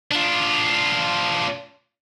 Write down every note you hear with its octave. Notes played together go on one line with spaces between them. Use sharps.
D4 F4